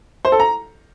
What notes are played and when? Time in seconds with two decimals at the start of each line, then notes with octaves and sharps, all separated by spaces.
0.25 C5
0.32 A4
0.40 A#5